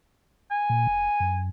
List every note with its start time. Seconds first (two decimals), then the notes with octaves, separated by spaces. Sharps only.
0.51 G#5
0.70 A#2
0.87 F1
1.20 F#2